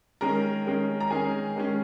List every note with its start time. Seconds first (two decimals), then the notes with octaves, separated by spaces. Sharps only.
0.21 D#3 G#3 C#4 A#4 A#5
0.66 D#3 G#3 C#4
1.01 A#5
1.11 D#3 G#3 C#4 G#4 G#5
1.56 D#3 G#3 C#4